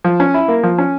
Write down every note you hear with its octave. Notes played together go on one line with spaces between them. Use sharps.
F3
C#4
E4
A#3
F3
C#4